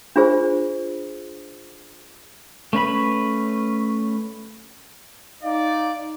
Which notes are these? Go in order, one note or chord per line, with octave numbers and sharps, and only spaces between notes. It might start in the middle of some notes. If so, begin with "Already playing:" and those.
D4 F4 G#4 C5
A3 C#4 B4 B5
D#4 D5 F5